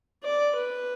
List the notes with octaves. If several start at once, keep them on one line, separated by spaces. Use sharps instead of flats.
D5
B4